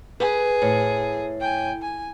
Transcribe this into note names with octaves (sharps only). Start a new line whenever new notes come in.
G#4 B4
A2
G5 G#5
G#5